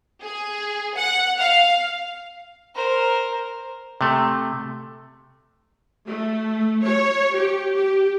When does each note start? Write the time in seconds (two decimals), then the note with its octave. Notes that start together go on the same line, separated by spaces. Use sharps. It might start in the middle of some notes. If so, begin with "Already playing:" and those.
0.22 G#4
0.97 F#5
1.40 F5
2.75 A#4 C5
4.01 C3 A3
6.07 A3
6.83 C#5
7.36 G4
7.74 G4